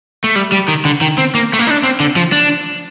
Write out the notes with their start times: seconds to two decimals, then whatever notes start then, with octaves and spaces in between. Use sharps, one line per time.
0.24 A3
0.36 G3
0.52 G3
0.68 D#3
0.85 D3
1.01 D#3
1.18 C4
1.35 A#3
1.53 A3
1.59 A#3
1.67 D#4
1.71 D4
1.83 C4
2.00 D3
2.16 F3
2.32 D4